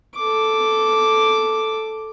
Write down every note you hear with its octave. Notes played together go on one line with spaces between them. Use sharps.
A4 D6